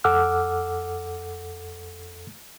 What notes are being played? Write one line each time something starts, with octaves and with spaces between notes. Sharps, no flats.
F2 A4 F#5 D6 E6 F6